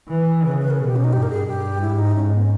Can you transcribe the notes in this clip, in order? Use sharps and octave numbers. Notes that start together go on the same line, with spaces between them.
E3 B4
C#3 B4
B4
A#4
B2 G#4
G4
C#4
D#4
G2 G4
A#4
G#4
G2 G4
G#2 E4
D#4
G#2 C#4
B3
C#4